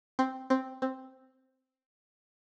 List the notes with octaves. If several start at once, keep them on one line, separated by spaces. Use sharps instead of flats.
C4
C4
C4